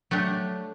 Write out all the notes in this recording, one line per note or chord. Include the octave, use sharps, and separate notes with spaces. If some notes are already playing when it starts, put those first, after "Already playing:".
F#3 A3 D4 G4